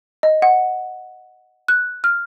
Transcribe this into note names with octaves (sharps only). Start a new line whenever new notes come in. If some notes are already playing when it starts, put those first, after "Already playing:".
D#5
F#5
F#6
F6